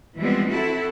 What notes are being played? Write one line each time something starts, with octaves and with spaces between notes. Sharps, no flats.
E3 F3 G3 G#3 B3 C4
C4 E4 F#4 A4